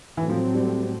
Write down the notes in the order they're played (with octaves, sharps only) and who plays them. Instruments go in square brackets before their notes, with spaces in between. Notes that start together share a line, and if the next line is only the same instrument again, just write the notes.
[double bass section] A2 F#3 A3 C4 [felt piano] E3
[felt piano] F3
G3